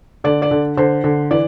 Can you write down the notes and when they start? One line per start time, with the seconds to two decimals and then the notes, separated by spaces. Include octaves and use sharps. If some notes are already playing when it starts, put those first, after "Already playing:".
0.24 D3 D5
0.42 D5
0.51 D3
0.77 D3 C5
1.04 D3
1.31 E3 D5